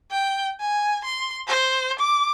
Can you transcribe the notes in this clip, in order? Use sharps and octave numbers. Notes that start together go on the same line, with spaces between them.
G5
G#5
C6
C5
D6